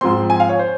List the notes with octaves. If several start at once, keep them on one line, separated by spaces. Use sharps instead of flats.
G#2 F3 C4 C6
G#5
F5
C#5
C5